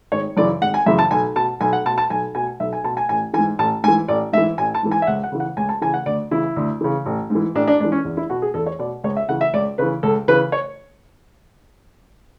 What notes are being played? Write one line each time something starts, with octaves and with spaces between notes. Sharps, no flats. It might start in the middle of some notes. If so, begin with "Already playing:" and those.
G#1 C#5
F#2 C#3 E3 D5
G#1 F#5
G#5
F#2 C#3 E3 E5
A5
B1 G#5
B2 A5
B1 G#5
F#5
B2 A5
A5
B1 G#5
B2 G#5
B1 E5
G#5
B2 A5
G#5
A1 G#5
G#2 E3 G#5
A1 A5
G#2 E3 G#5
A1 D5
G#2 E3 E5
A1 G#5
A5
G#2 E3
G#5
E5
C#2 F#5
F#5
C#3 E3
F#5
C#2 G#5
A5
C#3 E3 G#5
F#5
D2 D5
C#3 E3 E4
D2
C#3 E3
A1
G#2
E3
A1 D4
D4
G#2 E3 D4
C#4
E2
E4
B2 F#4
G#4
E2 A4
C#5
B2 D5
C#2 C#5
E5
C#3 E3 F#5
E5
C#2 D5
C#3 E3 B4
C#2 A4
C#3 E3 B4
C#5